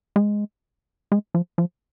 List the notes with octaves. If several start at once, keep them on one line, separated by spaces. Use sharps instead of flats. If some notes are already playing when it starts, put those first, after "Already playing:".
G#3
G#3
F3
F3